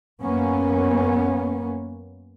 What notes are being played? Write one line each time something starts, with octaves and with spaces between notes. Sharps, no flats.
F#2 A#3 B3 C#4